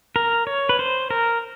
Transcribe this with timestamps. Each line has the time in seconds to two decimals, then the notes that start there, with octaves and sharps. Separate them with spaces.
0.16 A#4
0.47 C#5
0.69 B4
0.79 C5
1.10 A#4